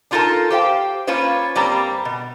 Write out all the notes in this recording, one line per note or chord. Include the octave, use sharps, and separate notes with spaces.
D4 D#4 F4 A4 A#4 A5
G4 C5 F5 G5
A#3 C#4 F4 B4 C5
G2 G3 A#3 C4 A#5
B2